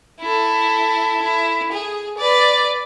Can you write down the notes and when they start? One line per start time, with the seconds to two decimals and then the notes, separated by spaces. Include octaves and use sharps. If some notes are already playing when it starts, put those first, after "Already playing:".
0.20 E4 A4
1.22 E4
1.72 G#4
2.18 B4 D5